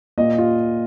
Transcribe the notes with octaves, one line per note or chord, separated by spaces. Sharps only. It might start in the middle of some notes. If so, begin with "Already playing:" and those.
A#2 D#5
F4